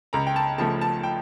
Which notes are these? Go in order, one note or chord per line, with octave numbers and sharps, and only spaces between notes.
C#2 A#5
G5
A5
C#3 F3 A3 A5
A5
G5